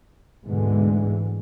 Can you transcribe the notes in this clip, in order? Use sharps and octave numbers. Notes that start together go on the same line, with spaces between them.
D2 G#2 B2 D3 E3 G#3